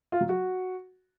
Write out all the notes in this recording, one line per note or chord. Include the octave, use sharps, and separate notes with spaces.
F4
F#3
F#4